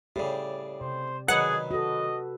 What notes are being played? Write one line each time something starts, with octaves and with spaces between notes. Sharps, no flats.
A2 C#3 G4 D5
C3 C5
B2 D#3 F#3 G#4 B4 F#5
F#4 A4 D#5